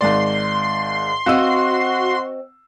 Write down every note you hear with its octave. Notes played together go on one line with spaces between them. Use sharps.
G#1 G#2 D5 C6
C4 F#4 D#5 F5 E6